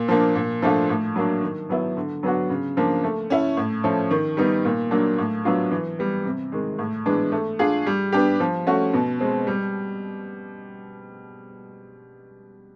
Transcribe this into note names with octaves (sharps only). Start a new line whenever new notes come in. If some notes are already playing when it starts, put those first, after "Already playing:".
Already playing: A#2
F3 A#3 D4
A#2
F3 A3 D4 F4
A2
F#3 A#3 D4
D#3
F#3 B3 E4
D3
F#3 B3 D4 F#4
C#3
F3 A#3 D4
A3
C#4 E4
A2
F3 A3 C#4
D#3
G3 B3 D#4
A#2
F#3 A#3 D4
A2
F#3 B3 D4 F4
E3
G3 B3
C3
D#3 G#3
A2
E3 G#3 B3 D4
A3
D4 F4 G#4
G3
B3 D4 G4
F3
A3 C#4 F#4
B2
G#3 C4
G3